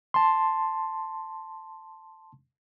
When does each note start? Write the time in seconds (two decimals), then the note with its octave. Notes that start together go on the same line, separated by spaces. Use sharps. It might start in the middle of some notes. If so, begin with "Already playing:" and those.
0.14 A5 C6